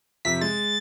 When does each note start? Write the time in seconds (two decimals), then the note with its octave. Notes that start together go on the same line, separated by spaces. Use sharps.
0.25 F2 C3 E5 B6
0.41 G#3 A6